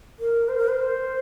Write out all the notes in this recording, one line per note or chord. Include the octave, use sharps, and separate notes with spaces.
A#4
C5
A#4
C5